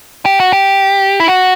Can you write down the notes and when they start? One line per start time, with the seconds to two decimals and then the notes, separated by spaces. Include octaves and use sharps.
0.25 G4
0.40 F#4
0.53 G4
1.20 E4
1.28 F#4